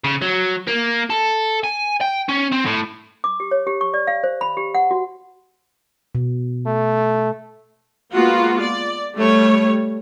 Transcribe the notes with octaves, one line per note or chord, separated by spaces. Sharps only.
C#3
F#3
A#3
A4
G#5
G5
C#4
C4
A2
D6
G4
C#5
G4
C#6
D5
F5
C5
B5
G4
F#5
F#4
B2
A3
G#3 A#3 B3 F4 F#4
D5
G3 A3 C#5